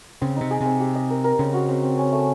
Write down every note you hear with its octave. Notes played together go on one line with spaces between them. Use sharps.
C#3 C4
C3 D#4
G#4
C3 C4
G4
D#5
A#4
A#4
C#3 C4
F#4
C4
C4
C#4
A3